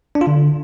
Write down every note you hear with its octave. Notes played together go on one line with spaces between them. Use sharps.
D4
F4
D3